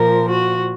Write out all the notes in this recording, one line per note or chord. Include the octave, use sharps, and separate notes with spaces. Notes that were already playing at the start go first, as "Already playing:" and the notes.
Already playing: A#2 F3 A#4
F#4